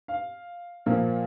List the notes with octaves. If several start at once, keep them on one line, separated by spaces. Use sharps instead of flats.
F5
A#2 F3 A#3